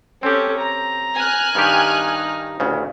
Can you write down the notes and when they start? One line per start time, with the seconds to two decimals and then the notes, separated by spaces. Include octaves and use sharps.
0.23 C4 C#4 G4 A4
0.58 A#5
1.16 G#5 F6 F#6
1.55 G2 D#3 D#4 G4
2.60 A1 D2 C#3